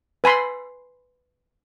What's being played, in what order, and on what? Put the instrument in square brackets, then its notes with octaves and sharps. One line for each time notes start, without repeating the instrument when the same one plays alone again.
[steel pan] B4 G#5 B5 C6